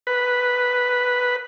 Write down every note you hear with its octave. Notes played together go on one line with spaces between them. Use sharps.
B4